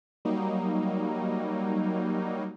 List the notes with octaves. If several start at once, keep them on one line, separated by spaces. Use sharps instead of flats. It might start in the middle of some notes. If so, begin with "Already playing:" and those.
F#3 G3 A#3 D#4